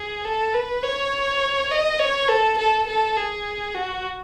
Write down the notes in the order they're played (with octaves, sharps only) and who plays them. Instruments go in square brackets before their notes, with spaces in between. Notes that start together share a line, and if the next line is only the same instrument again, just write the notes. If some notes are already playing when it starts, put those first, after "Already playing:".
Already playing: [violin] G#4
A4
B4
C#5
D#5
C#5
A4
A4
A4
G#4
F#4